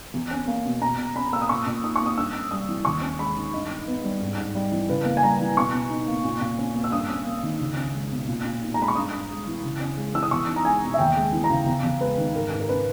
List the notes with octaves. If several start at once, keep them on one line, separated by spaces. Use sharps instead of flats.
E2
C#4
A#3
B2
B2 A#5
B2
C#4 B5
A#3 E6
D#6
A#2 C#6
A#2
D#4 D#6
A#3 C#6
D#6
G2 E6
C#4
G3 D#6
E3
D#2 C#6
C#4
G#3 B5
D#3
G2 D#5
D#4
B3
G3
G#2
G#2
G3
E3
C#3 B4
A#3
G#5
G3 A#5
E3
B2 C#6
B2
D#4
A#3
A#2
A#2
C#4
A#3
E6
G2 D#6
C#4
A#3
D#3
C#2
C#4
G#3
B2
A#2
A#2
D#4
A#5
G#3 B5
C#6
G2 D#6
G2
G#3
E3
C#3
C#4
G#3
E3 E6
D#6
E2 C#6
D#4
A#5
G#3 G#5
B2
E5
D#2 G5
G#3
E3
A#5
C#3
E2
E2
G#3 B4
D#3
G#2 A#4
G#2
A#4
C#4 B4